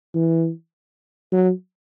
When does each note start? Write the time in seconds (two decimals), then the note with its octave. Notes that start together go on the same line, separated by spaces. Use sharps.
0.15 E3
1.32 F#3